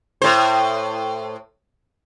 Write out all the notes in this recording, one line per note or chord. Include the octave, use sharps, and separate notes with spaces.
A2 C5